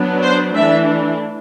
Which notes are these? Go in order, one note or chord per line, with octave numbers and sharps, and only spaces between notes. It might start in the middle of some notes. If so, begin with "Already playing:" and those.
Already playing: F#3 B3 D4
C5
E3 A3 D4 E5